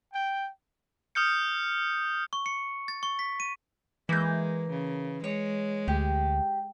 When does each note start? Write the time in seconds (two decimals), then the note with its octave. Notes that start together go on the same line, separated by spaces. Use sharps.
0.12 G5
1.15 D#6 F6 G6 C#7
2.33 C#6
2.46 C#7
2.88 A6
3.03 C#6
3.19 B6
3.40 D#7
4.09 E3 G#3 A#3 G6
4.70 C#3
5.24 G#3 C#5
5.88 D2 G4